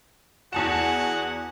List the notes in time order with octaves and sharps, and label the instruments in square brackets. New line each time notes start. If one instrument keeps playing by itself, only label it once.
[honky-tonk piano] E2 A5 E7 [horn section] F#4 G#4 F#5